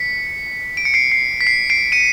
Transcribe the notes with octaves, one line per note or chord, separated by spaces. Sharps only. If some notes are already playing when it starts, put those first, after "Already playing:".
Already playing: B6 C#7
D7
C#7
C7 D7
C7
B6
C7
C7 D7
C#7 D#7